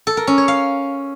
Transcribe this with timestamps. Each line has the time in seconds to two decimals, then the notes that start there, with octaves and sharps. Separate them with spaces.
0.07 A4
0.17 A#4
0.27 C#4
0.38 C#5
0.48 F5